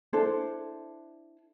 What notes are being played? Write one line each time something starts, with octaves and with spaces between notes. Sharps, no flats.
D4 E4 A4 C5